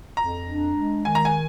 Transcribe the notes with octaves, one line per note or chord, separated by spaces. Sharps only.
F2 A#5
D4
G#3
D#3 G#5
A#5
G#5